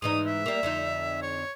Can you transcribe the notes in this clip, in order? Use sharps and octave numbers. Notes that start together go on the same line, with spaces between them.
G#2 E3 D#4 D#6
E5
G3 A#3
F2 D3 D#4
C#5